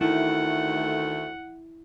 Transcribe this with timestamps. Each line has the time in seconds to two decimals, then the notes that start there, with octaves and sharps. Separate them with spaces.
0.01 D2 D#3 A3 E4 F#5